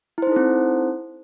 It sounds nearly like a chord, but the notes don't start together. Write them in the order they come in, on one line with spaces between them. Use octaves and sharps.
E4 C5 D#4 A4 C4